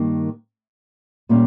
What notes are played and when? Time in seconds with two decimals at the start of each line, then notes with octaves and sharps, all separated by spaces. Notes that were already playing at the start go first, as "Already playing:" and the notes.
Already playing: G2 D#3 A#3
1.29 A#2 G3 A#3 C#4 G4